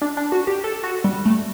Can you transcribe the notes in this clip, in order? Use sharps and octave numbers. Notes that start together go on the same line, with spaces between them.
D4
D4
F#4
G4
A4
F#4
G3
A3